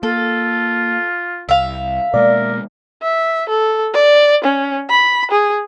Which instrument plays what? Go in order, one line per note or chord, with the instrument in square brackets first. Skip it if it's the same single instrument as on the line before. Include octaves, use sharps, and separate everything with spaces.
[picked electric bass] A#3 [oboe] F4 [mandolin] A4
[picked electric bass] C2 [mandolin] E5 F5
[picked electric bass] B2 G#3 A#3 [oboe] A#4 [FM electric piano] D5
[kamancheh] E5
A4
D5
C#4
B5
G#4